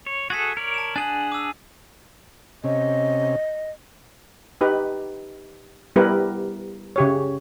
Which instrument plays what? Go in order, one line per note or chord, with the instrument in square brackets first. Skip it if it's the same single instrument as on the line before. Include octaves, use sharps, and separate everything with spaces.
[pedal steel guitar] C#5
[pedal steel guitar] F#4 G#4 A4 [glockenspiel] G#6 B6
[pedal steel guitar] A#4 C#5 D5
[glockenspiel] A5 E7
[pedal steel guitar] D4 G#4 F#5 [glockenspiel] G#5 F#7
[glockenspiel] D6 E6
[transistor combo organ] C3 C#4 [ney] D#5
[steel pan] D#4 G4 B4
G3 B3 E4 G4 A#4 B4
C#3 G4 C#5